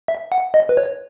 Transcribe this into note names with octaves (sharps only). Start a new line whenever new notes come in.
E5
F#5
D#5
B4
C#5